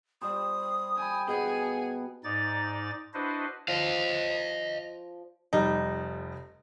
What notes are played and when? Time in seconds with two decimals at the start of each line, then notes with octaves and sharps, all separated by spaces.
0.22 G3 G4 C5 D#6
0.97 G5 G#5 B5
1.28 B2 G#4 F#5 G#5
1.62 A5
2.24 G#2 D#4 D5 A6
3.14 D4 E4 F#4 B4 C5 D#5
3.68 F3 D5 D#5 F5
5.53 F1 G3 D#4